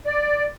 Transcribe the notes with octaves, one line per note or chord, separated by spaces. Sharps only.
D5